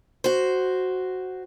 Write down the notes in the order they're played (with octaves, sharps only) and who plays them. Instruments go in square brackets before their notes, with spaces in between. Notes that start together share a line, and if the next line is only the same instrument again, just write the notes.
[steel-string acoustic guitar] F#4 C5